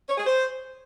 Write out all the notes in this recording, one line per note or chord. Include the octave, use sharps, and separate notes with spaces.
C#5
G#4
C5